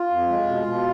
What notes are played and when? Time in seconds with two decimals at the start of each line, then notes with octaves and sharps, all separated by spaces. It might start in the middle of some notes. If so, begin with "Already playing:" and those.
Already playing: F4
0.10 F2
0.29 G#3
0.47 B2
0.66 B2